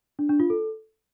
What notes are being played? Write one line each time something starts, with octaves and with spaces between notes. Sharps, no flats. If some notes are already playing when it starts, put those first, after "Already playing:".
D4
D4
F4
A4